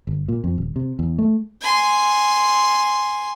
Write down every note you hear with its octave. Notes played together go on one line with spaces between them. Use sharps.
G1
A#2
F2
D#1
C3
E2
A3
G#5 C6